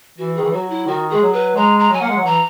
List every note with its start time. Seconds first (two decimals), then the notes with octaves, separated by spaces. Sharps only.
0.18 E3 F#4
0.36 D#3 G#4
0.45 E3
0.53 F#3 F#4
0.70 E4
0.87 D#3 F#4
1.10 G#3 G#4
1.22 F#3
1.33 B4
1.56 G#3 A#5
1.80 A#5
1.91 F#3 G#5
2.02 A#3 F#5
2.09 G#3
2.17 F#3
2.25 E3 A#5